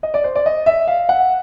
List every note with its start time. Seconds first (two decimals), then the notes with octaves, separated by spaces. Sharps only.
0.03 D#5
0.14 D5
0.24 C5
0.35 D5
0.46 D#5
0.66 E5
0.88 F5
1.09 F#5